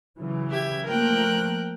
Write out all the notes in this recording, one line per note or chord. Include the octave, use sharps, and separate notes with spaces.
C#3 E3 F#3
G4 E5 G#6
F3 A3 A#3 A#4 G5 F#6